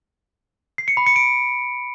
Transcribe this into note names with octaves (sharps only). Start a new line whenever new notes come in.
C7
C#7
B5
C#7
D7